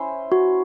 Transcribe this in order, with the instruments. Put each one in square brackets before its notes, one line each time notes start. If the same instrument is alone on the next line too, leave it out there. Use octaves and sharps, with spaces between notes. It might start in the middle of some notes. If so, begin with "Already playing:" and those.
Already playing: [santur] C#4 E4 C5
[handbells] F#4